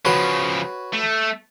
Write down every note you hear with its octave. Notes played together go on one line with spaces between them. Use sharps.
C#3 F3 F#4 B4 C#5
A3